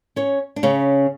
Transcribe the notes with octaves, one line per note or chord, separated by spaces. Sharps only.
C#4 C#5
D4
C#3 C#4